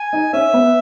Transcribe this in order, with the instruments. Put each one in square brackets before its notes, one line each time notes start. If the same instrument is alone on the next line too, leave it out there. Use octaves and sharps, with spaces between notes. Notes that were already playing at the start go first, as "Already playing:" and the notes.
Already playing: [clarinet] G#5
[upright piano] D#4
[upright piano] C#4 [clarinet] E5
[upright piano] B3